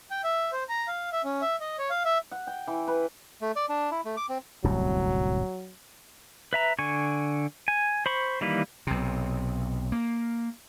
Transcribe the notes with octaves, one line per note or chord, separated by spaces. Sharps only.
G5
E5
C5
A#5
F5
E5
C#4
E5
D#5
C#5
F5
E5
F#5
G5
E3
B4
A3
D5
D4
E4
A3
D6
C4
D1 C2 F#2 F#3
B4 E5 A#5
D3 G#5 C#6
G#5
C5 B5 C#6
D#3 E3 G3 A#3 B4
B1 C3
A#3